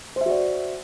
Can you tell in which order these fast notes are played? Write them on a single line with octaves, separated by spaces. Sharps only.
C5 E5 F#4 D5